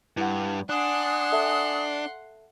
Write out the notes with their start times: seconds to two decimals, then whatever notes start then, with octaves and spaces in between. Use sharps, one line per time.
0.17 G2 E4 F#5
0.69 D4 F#5 G#5 C6 D#6 F#6 E7
1.32 A4 E5 A5